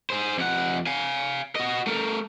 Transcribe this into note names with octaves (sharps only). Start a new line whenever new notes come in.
G#4 C5
F2 F#5
F5 G#5
F#4 D#5
A3 A#4